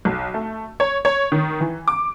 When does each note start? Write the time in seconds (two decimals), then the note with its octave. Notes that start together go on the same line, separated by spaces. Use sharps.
0.05 B1
0.34 A3
0.80 C#5
1.05 C#5
1.32 D#3
1.60 E3
1.88 D6